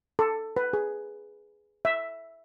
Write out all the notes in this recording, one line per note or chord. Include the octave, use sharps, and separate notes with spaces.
A4
B4
G#4
E5